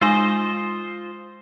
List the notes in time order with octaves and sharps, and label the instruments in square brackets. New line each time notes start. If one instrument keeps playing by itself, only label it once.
[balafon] G#3 D#4 G#5 [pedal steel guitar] F4 C5 D#5